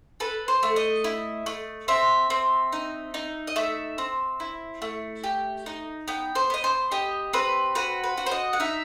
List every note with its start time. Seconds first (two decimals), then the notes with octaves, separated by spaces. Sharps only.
0.20 A4 B4
0.48 C5
0.63 A3
0.76 D#5
1.04 E4
1.46 A3
1.88 C4 E5
2.30 C4
2.72 D#4
3.14 D#4
3.47 D#5
3.56 A3 E5
3.98 C4
4.40 E4
4.82 A3
5.24 G4
5.66 D#4
6.08 B3 G5
6.35 C5
6.50 B3 D#5
6.64 C5
6.92 G4 D#5
7.33 C4 B4
7.75 F#4 B4
8.04 B4
8.17 F#4
8.26 C5
8.31 D#5
8.53 F#5
8.60 D#4 E5